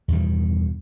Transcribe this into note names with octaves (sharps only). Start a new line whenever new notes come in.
E2 G2 B2 D#3